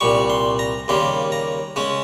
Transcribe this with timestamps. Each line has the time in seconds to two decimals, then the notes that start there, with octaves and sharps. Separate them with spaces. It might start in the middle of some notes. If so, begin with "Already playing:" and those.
0.01 C2 A#2 G3 C#6
0.30 C6
0.59 A#5
0.88 D#2 C#3 G3 A#3 C6
1.32 A#5
1.76 C#3 G#3 C#4